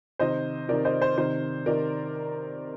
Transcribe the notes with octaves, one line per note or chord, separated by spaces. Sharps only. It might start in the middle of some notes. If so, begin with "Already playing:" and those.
C3 D#3 C5 D#5
C3 D#3 A#4 D5
C5 D#5
C5
C3 D#3 C5
C3 D#3 A#4 D5